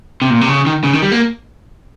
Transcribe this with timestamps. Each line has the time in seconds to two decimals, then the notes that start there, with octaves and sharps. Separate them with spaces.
0.22 C3
0.30 A#2
0.41 C3
0.49 C#3
0.66 D#3
0.84 C#3
0.93 D#3
1.02 G3
1.12 A#3